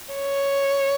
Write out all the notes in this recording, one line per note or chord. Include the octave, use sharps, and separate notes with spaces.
C#5